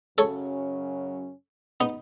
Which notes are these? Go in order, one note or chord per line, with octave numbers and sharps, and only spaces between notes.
F#2 C#3 F#3 C#4 A4 C#5
B3 D#4